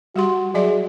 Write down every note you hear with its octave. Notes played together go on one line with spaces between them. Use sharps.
G3 F#4 G4 C6
F#3 G#4 D5 E5